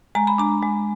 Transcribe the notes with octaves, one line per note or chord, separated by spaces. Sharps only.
G#3 A#5
B5
D4 A#5
G#3